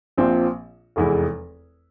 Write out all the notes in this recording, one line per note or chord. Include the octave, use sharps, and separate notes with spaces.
A#1 A#2 F3 C4
F1 E2 E3 G#3 E4